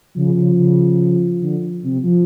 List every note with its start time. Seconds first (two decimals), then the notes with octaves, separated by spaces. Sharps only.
0.16 C#3 F3
0.37 C#3
0.58 C#3
1.41 D3
1.83 C3
2.04 F3